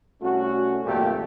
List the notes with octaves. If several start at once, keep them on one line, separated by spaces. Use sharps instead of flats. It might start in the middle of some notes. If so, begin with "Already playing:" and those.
C2 A3 C#4 F#4
G#1 F2 A#2 A3 A#3 G4